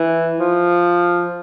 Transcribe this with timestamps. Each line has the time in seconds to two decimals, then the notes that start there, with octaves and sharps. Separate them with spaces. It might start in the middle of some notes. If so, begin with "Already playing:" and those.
Already playing: E3
0.39 F3